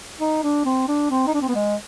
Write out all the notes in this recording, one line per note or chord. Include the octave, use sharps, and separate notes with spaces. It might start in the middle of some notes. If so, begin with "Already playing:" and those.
D#4
D4
C4
D4
C4
D#4
D4
C4
B3
G#3